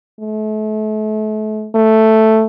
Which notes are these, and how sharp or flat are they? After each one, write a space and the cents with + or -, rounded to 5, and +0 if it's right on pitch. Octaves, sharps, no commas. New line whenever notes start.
A3 -35
A3 +0